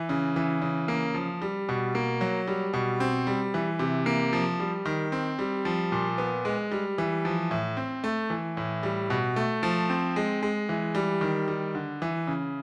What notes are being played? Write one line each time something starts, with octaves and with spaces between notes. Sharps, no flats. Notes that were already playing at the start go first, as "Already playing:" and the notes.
Already playing: E3
C#3
E3
C#3
A#3
F3
G3
B2
A#3
F#3
G3
B2
C4
G3
E3
C3
A#3
F3
G3
D#3
C4
G3
F3
A#2
B3
G#3
G3
E3
F3
A2
C4
A3
E3
A2
G3
B2
A3
F3
C4
G#3
G#3
E3
G3
D#3
G3
D3
E3
C#3